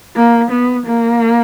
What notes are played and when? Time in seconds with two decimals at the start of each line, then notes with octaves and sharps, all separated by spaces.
0.16 A#3
0.51 B3
0.87 A#3